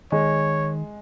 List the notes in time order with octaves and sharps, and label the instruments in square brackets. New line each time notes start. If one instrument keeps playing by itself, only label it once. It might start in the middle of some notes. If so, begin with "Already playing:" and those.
[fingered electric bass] D#3 [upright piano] G#3 [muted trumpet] C#5